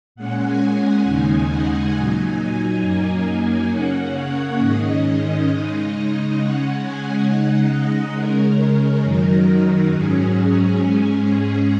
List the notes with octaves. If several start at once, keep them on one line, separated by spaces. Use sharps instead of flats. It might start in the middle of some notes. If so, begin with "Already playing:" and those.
A#2 G#3 C#4 F#5
G#5
F#5
D#2 C#3 G#3 D#4 G#5
F#5
A#2 F#3 D#4 G#5
F#2 F#3 A#3 D#4
C#3 A#3 C#4 F#5
C#5
G#2 D#3 G#3 C#4 D#5
C#3 G#3 D#4
C#3 G#3 C#4 F#5
G#5
C#3 G#3 D#4 F#5
D#5
C#3 G#3 C#4 A#4
F#2 D#3 F#3 D#4
G#2 F#3 C#4 G#4
G#2 G#3 C#4